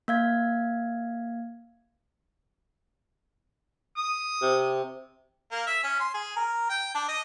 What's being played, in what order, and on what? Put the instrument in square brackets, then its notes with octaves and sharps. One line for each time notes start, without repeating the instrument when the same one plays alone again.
[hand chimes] A#3 F5 G#6
[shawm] D#6
[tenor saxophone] C3
[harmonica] A#3
E5
C#4
C6
G#4
A#4
G5
D4
D#5